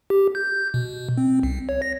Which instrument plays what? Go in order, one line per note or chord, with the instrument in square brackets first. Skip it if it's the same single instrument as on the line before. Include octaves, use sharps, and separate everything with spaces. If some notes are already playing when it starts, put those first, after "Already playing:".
[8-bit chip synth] G4
G6
B2
C4
C2
C#5
A#6